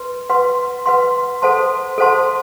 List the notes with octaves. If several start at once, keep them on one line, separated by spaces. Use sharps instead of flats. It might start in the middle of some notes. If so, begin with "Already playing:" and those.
Already playing: B4 C6
B4 F#5 C6
B4 F#5 C6
A4 C5 F#5 A5 C6
A4 C5 F#5 A5 C6